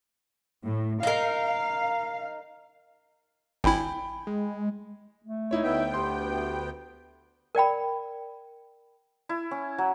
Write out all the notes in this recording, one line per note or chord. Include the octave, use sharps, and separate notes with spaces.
A2
D#4 A#4 F5
G#1 E4 G5 G#5 B5
G#3
A3
D#4 E4 C#5
D2 B3 E5 G5
G4 C6
A#4 D5 G5 B5
E4
C#4
F#3